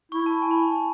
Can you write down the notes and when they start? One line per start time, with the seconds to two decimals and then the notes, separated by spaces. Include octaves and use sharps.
0.12 E4 C#6
0.26 A5
0.42 G#5
0.51 B5
0.57 A5
0.72 A5